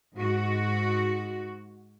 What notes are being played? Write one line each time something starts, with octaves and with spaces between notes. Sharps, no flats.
G#2 F#4